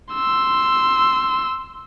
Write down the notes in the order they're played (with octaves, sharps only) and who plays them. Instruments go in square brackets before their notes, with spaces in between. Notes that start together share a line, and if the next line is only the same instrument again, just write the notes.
[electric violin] C6 E6